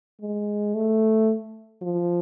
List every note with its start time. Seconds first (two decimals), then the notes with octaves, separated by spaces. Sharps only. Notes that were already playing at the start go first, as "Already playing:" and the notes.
0.21 G#3
0.75 A3
1.82 F3